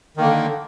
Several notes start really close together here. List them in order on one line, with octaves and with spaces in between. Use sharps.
D#3 A#3 D3